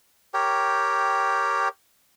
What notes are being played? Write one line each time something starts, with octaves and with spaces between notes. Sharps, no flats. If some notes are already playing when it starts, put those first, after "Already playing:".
G4 A#4 C#5 G5